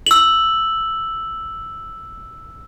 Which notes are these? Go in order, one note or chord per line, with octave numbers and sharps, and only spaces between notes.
E6 F#7